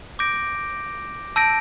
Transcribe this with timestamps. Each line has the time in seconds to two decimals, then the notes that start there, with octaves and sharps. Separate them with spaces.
0.19 D6 G6 A#6 D7
1.36 A5 E6 G6 A#6 D7